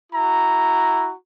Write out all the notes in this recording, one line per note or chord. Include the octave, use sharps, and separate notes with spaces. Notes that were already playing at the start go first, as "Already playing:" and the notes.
E4 F#4 A#5